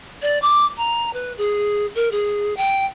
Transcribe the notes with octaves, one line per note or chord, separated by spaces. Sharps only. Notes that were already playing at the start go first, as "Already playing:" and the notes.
D5
D6
A#5
B4
G#4
A#4
G#4
G5